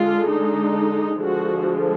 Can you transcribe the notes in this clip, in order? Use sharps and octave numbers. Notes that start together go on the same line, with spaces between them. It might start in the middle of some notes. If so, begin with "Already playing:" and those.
Already playing: D3 G#3 D4 F4
D#4
D3 F3 G#3 F#4